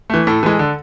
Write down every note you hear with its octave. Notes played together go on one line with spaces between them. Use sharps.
E3 A3
A2 A4
E3 G#3
D3